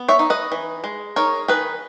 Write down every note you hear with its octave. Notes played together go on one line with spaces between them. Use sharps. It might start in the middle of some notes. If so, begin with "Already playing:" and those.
Already playing: B3
C#5 E5
D#4
B4 D#5
E3
G#3
D#4 A#4 C#5
D#3 G#4 B4